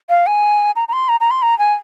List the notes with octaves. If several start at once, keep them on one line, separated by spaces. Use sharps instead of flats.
F5
G#5
A#5
A#5
C6
A#5
A#5
C6
A#5
G#5